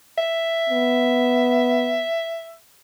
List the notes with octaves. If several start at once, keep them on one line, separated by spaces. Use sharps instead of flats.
E5
B3